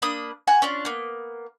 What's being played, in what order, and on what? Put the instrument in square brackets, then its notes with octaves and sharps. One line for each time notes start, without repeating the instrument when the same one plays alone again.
[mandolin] A#3 D4 B5 D#6
F#4 F#5 G#5
C#4 D4 F4
A#3 B3